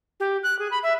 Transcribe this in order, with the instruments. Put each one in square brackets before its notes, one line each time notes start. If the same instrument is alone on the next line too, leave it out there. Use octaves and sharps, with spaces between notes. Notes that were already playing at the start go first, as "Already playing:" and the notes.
[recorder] G4
F#6
G#4
B5
E5